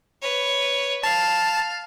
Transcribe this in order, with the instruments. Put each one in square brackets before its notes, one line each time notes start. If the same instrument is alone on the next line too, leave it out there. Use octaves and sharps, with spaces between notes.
[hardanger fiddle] B4 C#5
[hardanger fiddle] F5 [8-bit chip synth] A5